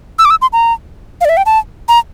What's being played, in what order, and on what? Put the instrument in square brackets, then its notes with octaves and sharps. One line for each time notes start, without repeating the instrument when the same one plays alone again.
[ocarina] E6
D6
E6
C6
A#5
F5
D5
E5
G5
A5
A#5